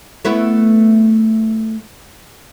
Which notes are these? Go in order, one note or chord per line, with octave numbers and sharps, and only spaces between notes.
A3 B3 E4